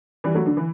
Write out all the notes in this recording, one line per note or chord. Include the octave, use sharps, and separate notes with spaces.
E3 G3
F#3 A3
D3
E3